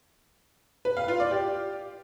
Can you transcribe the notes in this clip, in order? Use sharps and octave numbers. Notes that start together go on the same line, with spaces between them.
B4
F5
F4
D5
G4